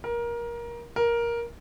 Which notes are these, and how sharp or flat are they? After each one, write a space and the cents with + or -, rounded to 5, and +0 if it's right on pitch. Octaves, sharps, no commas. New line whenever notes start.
A#4 +20
A#4 +10